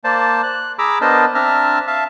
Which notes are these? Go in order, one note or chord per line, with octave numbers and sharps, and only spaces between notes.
A#3 C5 D5 A5
F#6
G#4 A#5 B5 D6 E6
B3 D4 A#4 C5 D#5 A5
C4 D4 E5 A5 A#5 F6
E5 F5 A5